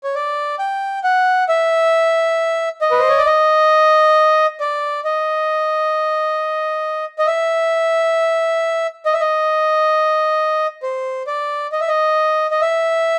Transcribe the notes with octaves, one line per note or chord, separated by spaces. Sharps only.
C#5
D5
G5
F#5
E5
D#5
B4
C5
C#5
D5
D#5
D5
D#5
D#5
E5
D#5
E5
D#5
C5
D5
D#5
E5
D#5
D#5
E5